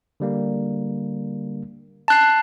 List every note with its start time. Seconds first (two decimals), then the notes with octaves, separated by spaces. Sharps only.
0.20 D3 G3 A#3
2.08 A5 F#6 C7